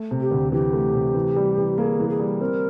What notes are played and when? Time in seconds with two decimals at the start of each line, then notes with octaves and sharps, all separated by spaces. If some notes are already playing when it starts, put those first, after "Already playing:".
Already playing: A3
0.11 C3
0.21 G4
0.31 D2
0.52 E3 G4
0.73 A3
0.95 C3
1.15 E3
1.36 G3
1.58 E3
1.78 A#3 G#4
1.99 E3
2.09 G#4
2.19 G3
2.40 C4 A#4